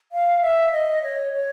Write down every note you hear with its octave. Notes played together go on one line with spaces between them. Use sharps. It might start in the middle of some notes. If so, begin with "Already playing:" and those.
F5
E5
D#5
C#5
C#5